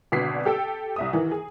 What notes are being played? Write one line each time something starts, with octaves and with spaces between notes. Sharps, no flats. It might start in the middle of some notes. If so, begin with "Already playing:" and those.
G#1 B2 D3 D5 B6 C7
G4 A4 G5 E6
C2 E5 D#6
D#3 E3
G#4